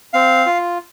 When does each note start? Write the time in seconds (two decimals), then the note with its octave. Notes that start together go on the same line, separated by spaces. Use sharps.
0.13 C4 F5
0.46 F4